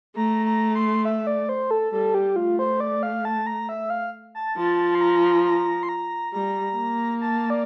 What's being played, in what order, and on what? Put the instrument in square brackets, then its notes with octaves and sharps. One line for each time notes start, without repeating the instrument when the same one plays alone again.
[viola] A3 [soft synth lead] A#5
[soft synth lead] A#5
C6
E5
D5
C5
A4
[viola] G3 [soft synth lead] A4
[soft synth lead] G4
[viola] A3 [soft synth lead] F4
[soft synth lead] C5
D5
F5
A5
A#5
E5
F5
A5
[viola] F3 [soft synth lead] A5
[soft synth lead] C6
A#5
A#5
C6
A#5
[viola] G3 [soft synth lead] A#5
[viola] A#3
[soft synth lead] A5
D5